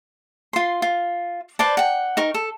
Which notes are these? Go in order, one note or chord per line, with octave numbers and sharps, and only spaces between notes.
F4 C6
F4
B4 C5 D5 A5
F#5 G5
D#4 A#4 C#6
A4